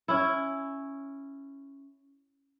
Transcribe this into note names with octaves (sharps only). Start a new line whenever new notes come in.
C#4 E4